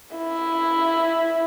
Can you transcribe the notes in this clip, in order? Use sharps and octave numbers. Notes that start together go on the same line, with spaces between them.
E4